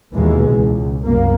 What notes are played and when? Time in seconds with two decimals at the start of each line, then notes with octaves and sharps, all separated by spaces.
0.14 D#2 B2 E3 G#3
0.50 C#2
1.05 C2 F#2 A#3